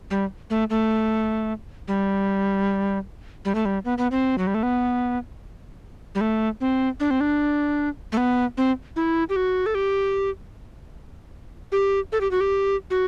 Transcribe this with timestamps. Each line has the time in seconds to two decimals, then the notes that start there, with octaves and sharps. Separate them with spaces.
0.11 G3
0.50 A3
0.70 A3
1.88 G3
3.45 G3
3.55 A3
3.65 G3
3.85 B3
3.98 B3
4.11 C4
4.38 F#3
4.47 G3
4.54 A3
4.63 B3
6.15 G3
6.21 A3
6.61 C4
7.00 D4
7.11 C4
7.21 D4
8.12 A3
8.17 B3
8.57 C4
8.96 E4
9.29 G4
9.36 F#4
9.66 A4
9.75 G4
11.72 G4
12.12 A4
12.21 G4
12.31 F#4
12.41 G4
12.90 F#4